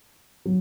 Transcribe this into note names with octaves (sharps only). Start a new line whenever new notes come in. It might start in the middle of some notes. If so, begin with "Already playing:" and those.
F#3